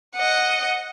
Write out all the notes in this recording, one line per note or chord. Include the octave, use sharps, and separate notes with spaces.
D#5 F#5